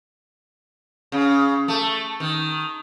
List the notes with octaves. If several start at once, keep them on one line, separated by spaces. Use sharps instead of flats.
C#3
A3
D#3